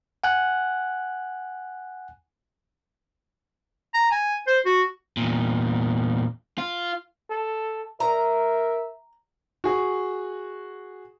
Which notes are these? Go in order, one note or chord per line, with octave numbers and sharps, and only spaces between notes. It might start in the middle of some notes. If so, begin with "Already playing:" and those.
F#5 G#5 F#6
A#5
G#5
C5
F#4
E2 A#2
F4
A4
A#4 E5 A#5
F#4 G#4